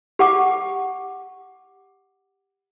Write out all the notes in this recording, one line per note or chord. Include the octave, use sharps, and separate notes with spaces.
G4 F#5 D6